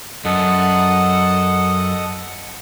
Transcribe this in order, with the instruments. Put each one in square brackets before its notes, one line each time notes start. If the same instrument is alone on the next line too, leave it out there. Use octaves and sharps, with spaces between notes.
[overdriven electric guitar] F#2 [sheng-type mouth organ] A4 D#5 F#5